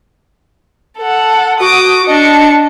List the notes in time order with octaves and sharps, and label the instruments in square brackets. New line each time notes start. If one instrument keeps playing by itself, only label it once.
[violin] A4 F#5
[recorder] F#4 [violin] D6 D#6
[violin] D4 C#7 [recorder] D#5